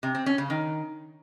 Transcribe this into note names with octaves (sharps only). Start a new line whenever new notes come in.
C3
C4
C#4
C#3
D#3